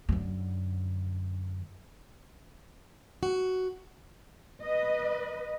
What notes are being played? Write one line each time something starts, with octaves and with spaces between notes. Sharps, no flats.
F#2 D3
F#4
B4 D#5